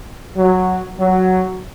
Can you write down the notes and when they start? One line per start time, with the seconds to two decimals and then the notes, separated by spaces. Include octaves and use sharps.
0.36 F#3
0.98 F#3